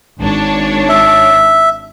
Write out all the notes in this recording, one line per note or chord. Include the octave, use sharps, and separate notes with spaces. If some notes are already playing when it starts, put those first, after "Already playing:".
G#1 D4 C#5
E5